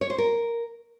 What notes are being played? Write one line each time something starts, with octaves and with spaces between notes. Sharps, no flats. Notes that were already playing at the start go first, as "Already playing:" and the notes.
C#5
C5
A#4